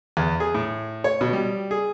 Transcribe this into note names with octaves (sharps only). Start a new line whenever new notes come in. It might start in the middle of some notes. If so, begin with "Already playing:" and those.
E2
G#4
A2
C#5
B2
G3
G#4